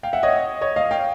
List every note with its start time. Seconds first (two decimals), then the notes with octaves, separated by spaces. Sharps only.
0.03 F5 G5
0.13 E5 F#5
0.23 C#5 D#5
0.61 C#5 D#5
0.76 D#5 F5
0.91 F5 G5